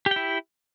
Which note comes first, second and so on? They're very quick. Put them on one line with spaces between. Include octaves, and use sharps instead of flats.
G4 G5 E4